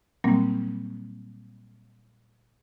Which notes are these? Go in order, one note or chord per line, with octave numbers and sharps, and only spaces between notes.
A#2 F#3 G3 A#3 C4